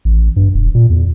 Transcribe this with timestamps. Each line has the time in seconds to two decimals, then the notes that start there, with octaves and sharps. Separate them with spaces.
0.05 A1
0.36 G2
0.54 E1
0.75 A#2
0.90 E2